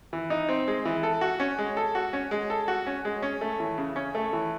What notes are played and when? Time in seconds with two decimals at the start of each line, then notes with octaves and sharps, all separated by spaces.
0.13 E3
0.30 D#4
0.49 C4
0.68 G#3
0.85 E3
1.03 A4
1.21 F#4
1.40 C#4
1.59 G#3
1.77 A4
1.95 F#4
2.13 C#4
2.31 G#3
2.50 A4
2.68 F#4
2.87 C#4
3.05 G#3
3.22 C#4
3.41 A3
3.60 E3
3.78 C#3
3.96 C#4
4.15 A3
4.33 E3